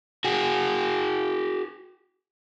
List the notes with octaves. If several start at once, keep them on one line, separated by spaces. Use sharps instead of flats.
F#4 G#4